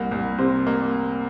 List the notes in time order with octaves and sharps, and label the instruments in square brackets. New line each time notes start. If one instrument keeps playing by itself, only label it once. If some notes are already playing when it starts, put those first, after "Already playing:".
Already playing: [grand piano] C2 A#3
C2
C3 C5
A#3